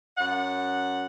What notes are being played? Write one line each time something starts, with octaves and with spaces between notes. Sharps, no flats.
F#2 F#5